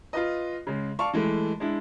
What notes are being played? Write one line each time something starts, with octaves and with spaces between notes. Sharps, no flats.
F4 B4 D#5
C#3 G#3
D5 F5 A5 C#6
E3 G#3 A3
G#3 D4 E4